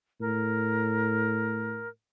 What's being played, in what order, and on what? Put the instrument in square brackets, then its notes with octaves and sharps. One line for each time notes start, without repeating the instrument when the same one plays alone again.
[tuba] A2 [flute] A#4